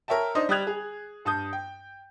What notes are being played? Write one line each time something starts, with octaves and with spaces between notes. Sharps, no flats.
A#4 C#5 E5 G5 A5
D4 D#4 C5 D#5
G3 G5 D#6 F#6 G#6 F7
G#4
G2 A5 D#6 G6
G5